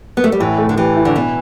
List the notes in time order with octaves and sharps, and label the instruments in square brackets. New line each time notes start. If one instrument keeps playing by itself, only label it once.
[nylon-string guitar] B3
A3
G3
[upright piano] A2 [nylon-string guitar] E3
[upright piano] A3
[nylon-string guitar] D3
[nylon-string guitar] E3 [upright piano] G4
[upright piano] E4
[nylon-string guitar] D3
[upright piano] B2 [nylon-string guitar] E3